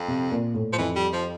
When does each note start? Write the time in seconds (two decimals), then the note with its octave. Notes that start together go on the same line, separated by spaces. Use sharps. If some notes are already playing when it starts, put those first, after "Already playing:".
Already playing: F2
0.08 C3
0.31 A#2
0.54 A2
0.73 F3
0.78 F2 E3
0.96 G3
1.13 F3